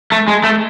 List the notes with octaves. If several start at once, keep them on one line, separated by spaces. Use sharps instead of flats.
A3
G#3
A3